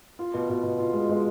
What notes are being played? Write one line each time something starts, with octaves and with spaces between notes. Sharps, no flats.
F4
B2
B2
B2
F4
G#3
G#3